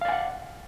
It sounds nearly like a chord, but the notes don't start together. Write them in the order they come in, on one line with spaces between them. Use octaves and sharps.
F5 D5 G#5 F#5